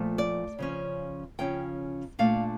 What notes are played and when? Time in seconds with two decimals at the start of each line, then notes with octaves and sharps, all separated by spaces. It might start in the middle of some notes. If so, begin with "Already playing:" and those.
Already playing: A#2 F3 A3
0.18 D5
0.59 C#3 F3 C#4
1.39 C#3 F3 C#4 G5
2.19 A#2 A3 D4 F5